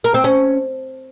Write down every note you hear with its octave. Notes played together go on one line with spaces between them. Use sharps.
A#4
C4
C#4